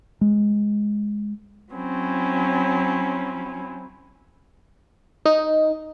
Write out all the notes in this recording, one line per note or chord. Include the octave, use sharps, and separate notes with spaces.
G#3
F#3 C4 C#4 E4
D#4